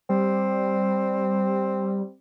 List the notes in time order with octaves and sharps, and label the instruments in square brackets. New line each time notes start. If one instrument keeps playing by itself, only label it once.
[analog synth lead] G3 [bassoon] C4